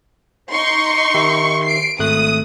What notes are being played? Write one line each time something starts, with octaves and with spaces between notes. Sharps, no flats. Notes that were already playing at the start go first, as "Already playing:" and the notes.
D#4 C6 C#6
D#3 G4 E5
C7 D7
G#1 A3 D#6 F#6